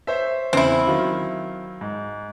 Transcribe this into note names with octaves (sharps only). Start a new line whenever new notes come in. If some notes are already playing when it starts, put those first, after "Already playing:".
C5 C#5 E5
E2 C#3 C4 E4
D#3 F#3 F4
G#2